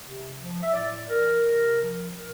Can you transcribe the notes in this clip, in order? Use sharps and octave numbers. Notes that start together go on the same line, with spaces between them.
C3
F3
E5
A2 D5
E3 A#4
C3
F3
A#2 A#4